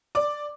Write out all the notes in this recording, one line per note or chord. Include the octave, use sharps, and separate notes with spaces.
D5 D6